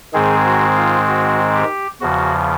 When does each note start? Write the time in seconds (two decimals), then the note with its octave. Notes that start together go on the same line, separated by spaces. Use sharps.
0.14 G#2 D#3 G#3 C4 G#4
0.44 F#4
0.76 F4
1.07 F#4
1.54 G4
2.01 E2 C#3 F3 F#4